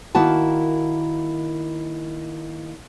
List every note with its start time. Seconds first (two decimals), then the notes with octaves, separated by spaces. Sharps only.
0.15 D#3 A#3 E4 F#4 A5